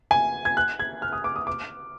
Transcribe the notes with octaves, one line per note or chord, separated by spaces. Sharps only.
G#5
G#6
F#6
G#6
F6
D#6
D6
D#6
D6